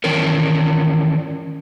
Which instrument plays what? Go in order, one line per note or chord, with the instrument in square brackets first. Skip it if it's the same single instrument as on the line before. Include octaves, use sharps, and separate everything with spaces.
[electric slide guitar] D#3 E3 C#4 A#4